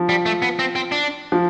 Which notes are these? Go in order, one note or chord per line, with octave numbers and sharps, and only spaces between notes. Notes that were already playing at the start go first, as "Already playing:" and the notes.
Already playing: F3
G3
A3
B3
C4
C4
D4
F3